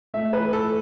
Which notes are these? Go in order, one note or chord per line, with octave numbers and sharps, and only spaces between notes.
A3 E5
B4
E3
A4